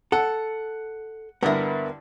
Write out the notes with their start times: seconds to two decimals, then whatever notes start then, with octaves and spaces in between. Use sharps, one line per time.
0.12 A4 F#5
1.43 G2 D3 B3 E4 A#4